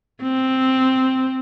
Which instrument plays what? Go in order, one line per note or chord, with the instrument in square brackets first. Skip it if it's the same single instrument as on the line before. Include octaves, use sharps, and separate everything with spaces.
[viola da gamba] C4